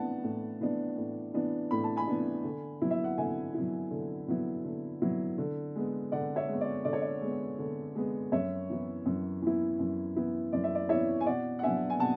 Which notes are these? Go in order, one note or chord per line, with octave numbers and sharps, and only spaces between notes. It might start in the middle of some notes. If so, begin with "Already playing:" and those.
Already playing: A2 E3 B3 D4 F#5 A5
A2
E3 B3 D4
A2
E3 B3 D4
A2 B5
A5
G#5 B5
E3 B3 D4
D3
F#3 B3 E4
E5
F#5
D3 E5 G#5
F#3 B3 E4
D3
F#3 B3 E4
D3
F#3 B3 E4
D3
G#3 B3
D3 D5 F#5
C#5 E5
G#3
B3
D5
D3 D5
C#5
D5
G#3 B3
D3
G#3 B3
F#2 C#5 E5
E3 B3 E4
F#2
E3 B3 E4
F#2
E3 B3 E4
F#2 D5
E5
D5
E3 B3 E4 C#5 E5
G#5
B2 D5 F#5
F#5
F#3 B3 D4 E5 G#5
G#5
B2 F#5 A5